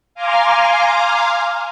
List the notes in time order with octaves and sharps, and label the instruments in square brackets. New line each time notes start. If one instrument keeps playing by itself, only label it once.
[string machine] F5 G#5 A#5 C6 D6 F6